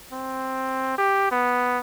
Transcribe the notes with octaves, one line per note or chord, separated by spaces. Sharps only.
C4
G4
B3